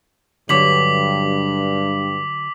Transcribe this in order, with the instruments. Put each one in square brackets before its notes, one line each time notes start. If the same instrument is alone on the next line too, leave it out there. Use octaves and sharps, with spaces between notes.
[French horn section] G2 [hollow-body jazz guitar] D3 F#3 [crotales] D6 B6 F#7